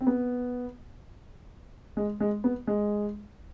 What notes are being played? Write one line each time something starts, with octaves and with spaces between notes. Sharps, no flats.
C4
B3
G#3
G#3
B3
G#3